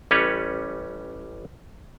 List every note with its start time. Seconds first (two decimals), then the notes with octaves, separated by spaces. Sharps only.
0.11 A1 G3 C#4 B4 C#5